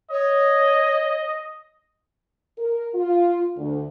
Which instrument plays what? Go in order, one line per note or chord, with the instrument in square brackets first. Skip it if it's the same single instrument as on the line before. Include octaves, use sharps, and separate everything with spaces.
[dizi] C#5 [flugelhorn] D#5
[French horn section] A#4
F4
D2